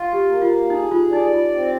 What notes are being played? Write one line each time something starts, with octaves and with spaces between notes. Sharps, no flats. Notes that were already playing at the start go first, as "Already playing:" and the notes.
Already playing: F4
G4
A#3
F4
D#4 G#4
F4
D#4 D5
F4
C4